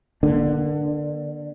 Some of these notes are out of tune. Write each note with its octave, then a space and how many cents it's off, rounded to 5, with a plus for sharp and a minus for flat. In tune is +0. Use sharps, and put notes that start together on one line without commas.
D3 +20 A#3 +40 D4 +10